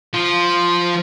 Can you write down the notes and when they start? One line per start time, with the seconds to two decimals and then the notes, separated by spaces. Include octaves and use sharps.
0.14 F3 F4